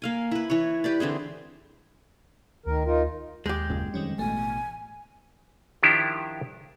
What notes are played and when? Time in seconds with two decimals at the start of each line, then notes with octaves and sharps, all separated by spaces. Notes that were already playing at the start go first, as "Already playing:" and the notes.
0.02 A#3 F5 G#5
0.31 E4 B4
0.50 E3 B4 C#5
0.84 G4 B4 D5
1.00 D3 E3 C4 G#4
2.66 D2 D#3 A#4
2.86 D#4 F4 A#4
3.46 D#2 G#3 G4 G6
3.70 F#1 A#2 C#3
3.94 F2 D#3 G3 C#4
4.19 A1 B2 A3 G#5
5.83 D#3 F3 D4 E4 F4 G4